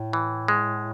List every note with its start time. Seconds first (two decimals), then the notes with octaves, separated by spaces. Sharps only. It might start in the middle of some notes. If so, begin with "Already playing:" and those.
Already playing: A2
0.13 E3
0.48 G#3